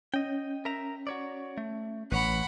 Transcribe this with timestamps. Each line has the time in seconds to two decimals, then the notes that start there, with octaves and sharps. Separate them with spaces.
0.14 C#4 D#5 G5
0.65 A#4 E5 A#5
1.07 F#4 C#5 D5
1.58 A3
2.12 A1 B4 C#5 F#5 B5